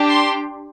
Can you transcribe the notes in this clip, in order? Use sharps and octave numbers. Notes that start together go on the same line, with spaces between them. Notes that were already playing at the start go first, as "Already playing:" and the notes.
Already playing: D4 G4
C6